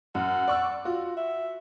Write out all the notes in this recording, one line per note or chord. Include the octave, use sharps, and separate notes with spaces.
F#2 F#5
D5 C#6 E6
F4 F#4
E5